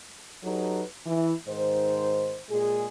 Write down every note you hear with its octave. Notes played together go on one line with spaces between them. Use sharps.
F#3 D#4 G4 A4 B4
E3 E4
G#2 D#3 C5
A#2 G#3 G#4